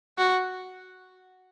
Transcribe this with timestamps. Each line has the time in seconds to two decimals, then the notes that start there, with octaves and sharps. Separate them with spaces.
0.18 F#4